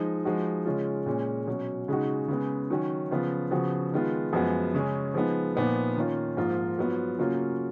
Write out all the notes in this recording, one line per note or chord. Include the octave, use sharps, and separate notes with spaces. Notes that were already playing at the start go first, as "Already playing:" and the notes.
Already playing: F3 G#3 D#4
F3 G#3 D#4 F#4
C#3 G#3 C#4 F4
A#2 G#3 C#4
B2 F#3 C#4
C#3 G#3 D#4 F#4
C#3 G#3 B3
D#3 F#3 C#4 F#4
C#3 F3 B3 F4
C#3 F3 B3 F#4
D#3 G#3 B3 F4
F#2 F3 G#3 B3
C#3 G#3 C#4
F3 G#3 B3 D#4
A#2 F3 B3 D#4
D#3 A#3 C#4 F4
G#2 F3 A#3 F4
G#2 F#3 B3 F4
C#3 F#3 A#3 C#4 F4